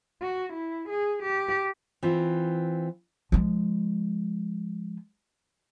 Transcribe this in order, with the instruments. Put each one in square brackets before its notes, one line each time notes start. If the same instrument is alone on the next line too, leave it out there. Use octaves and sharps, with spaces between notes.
[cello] F#4
E4
G#4
G4
[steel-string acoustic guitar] E3 C4 F4
[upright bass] F3 G#3